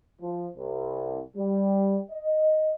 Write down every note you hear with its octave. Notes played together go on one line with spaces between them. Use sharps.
F3
C2
G3
D#5